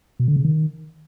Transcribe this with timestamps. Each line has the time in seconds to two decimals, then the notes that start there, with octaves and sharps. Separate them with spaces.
0.20 B2
0.28 D3
0.36 C#3
0.45 D#3